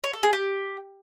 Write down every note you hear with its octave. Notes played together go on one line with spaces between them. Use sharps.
C#5
A4
G#4
G4